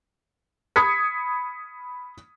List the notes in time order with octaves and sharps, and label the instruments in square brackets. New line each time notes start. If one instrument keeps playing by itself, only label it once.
[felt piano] B5 D#6 G#6 B6 C#7